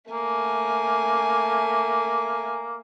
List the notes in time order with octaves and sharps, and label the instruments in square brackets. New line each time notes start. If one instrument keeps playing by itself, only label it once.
[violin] A3 G#5 [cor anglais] A#3